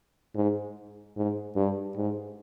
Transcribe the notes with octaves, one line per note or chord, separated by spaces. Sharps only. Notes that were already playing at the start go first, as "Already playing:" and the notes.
G#2
G#2
G2
G#2